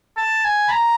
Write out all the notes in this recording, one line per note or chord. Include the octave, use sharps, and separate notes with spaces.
A5
G#5
B5
A#5